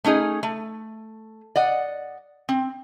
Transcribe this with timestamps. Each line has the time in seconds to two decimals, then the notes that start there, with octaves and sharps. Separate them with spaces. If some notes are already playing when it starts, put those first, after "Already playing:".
0.04 A3 C#4 D#4 G#4
0.43 A3
1.56 D5 D#5 F#5
2.49 C4